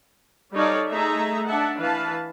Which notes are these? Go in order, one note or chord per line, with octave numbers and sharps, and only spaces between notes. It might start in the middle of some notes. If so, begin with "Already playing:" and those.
G3 D#4 A4 C#5 D5 F5
A3 D#4 G#4 E5 A#5
D4 E5 F#5 A5
E3 B4 F5 A5